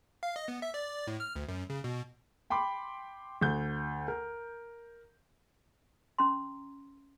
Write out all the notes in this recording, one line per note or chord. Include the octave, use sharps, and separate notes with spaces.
F5
D#5
B3
E5
D5
A2
F6
D2
F#2
C#3
B2
G5 B5 C6 D6
D2 G6
A#4
C#4 A#5 C6